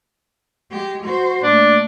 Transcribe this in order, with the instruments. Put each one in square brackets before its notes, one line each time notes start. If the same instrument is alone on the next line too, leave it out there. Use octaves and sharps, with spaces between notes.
[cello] G#3 G4
F#4 C5
[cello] A#2 A3 [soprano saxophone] D4